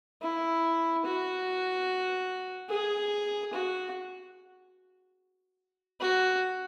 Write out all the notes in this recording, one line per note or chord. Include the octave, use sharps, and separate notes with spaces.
E4
F#4
G#4
F#4
F#4